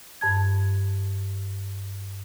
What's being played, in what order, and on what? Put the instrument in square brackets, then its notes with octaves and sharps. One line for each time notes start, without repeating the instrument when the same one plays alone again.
[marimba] G2 A5 G#6